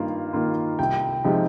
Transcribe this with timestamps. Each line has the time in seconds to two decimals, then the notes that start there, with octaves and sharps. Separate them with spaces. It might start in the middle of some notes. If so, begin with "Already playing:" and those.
Already playing: G2 D#3 A#3 F4
0.33 D#3 A#3 F4
0.79 C2 G5
1.24 C3 F3 G#3 D#4